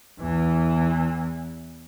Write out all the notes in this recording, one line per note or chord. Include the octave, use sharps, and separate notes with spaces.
E2 E3